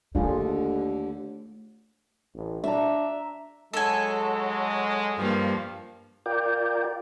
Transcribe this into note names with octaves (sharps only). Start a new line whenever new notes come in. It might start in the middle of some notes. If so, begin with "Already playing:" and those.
D#2 D3 A3 D4 F4 G#4
A1
D4 E5 A#5
F#3 G#3 A4 G#5
G2 F3 A#3
F4 A#4 D5 G5